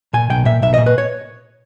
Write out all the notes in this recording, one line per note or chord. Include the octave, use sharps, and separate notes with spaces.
A#2 G#5
B1 G5
A#2 E5
B1 E5
D#5
A#2
B4
C#5